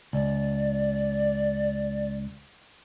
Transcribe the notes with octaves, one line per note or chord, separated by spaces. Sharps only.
C#2 D5